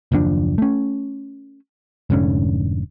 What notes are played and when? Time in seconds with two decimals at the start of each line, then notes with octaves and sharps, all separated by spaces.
0.12 F#1 D#2 F3 D4
0.58 A3 C#4
2.10 F1 G#2 D3 C#4